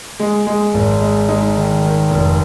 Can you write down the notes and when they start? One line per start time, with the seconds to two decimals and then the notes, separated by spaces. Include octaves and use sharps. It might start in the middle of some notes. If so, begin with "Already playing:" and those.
0.20 G#3
0.47 G#3
0.74 G#1
1.01 G#3
1.28 G#3 D#4
1.56 D#3
1.83 D#3
2.10 F1